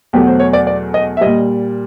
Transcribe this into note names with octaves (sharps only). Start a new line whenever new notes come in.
E2 B2 F#3 A3 G4
C5
C#5
D5
D5
D#5
E5
A#2 G3 D#5